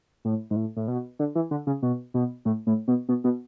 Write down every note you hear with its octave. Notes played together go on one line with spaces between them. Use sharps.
A2
G#2
A2
A2
B2
D3
E3
D3
C#3
B2
B2
A2
A2
B2
B2
B2